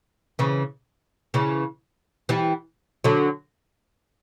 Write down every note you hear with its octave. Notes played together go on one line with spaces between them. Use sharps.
C#3 E3
C#3 E3
E3 G3
D3 F#3